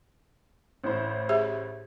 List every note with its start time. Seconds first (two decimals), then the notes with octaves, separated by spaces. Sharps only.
0.84 A1 A2 C5
1.29 G4 G#4 E5